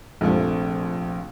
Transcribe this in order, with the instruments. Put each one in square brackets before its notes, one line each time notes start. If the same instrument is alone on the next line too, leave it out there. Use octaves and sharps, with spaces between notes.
[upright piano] A#1 C3 F3 A3